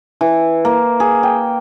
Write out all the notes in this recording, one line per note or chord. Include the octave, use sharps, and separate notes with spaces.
E3
A#3
G#4
G5